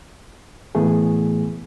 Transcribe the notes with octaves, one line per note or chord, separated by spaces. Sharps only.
A2 E3 A3 B3 G#4